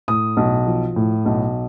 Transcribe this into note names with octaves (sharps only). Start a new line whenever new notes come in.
A2 D#6
B1
F3
A2
B1